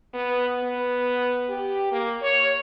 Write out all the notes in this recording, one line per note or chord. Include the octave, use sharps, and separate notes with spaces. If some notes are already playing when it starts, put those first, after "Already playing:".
B3
B3
G4
A#3
C#5